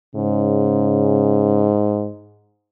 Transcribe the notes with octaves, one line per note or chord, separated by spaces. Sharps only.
G#2 C#3